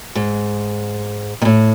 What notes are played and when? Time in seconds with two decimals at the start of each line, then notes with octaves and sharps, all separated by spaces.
0.15 G#2
1.42 A#2
1.45 A2